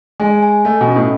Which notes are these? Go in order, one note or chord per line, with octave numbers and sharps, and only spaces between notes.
G#3 G#5
G#5
A3 D#5
B2
C#4
A2